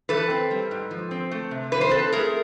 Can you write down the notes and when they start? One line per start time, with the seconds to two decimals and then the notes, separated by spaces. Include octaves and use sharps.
0.09 E3 A4 B4
0.30 C4
0.51 G3
0.71 G#2
0.91 F3
1.11 C4
1.31 A3
1.51 C3
1.72 F3 B4
1.81 C5
1.90 C4 A4 B4
2.12 A3 G#4 A#4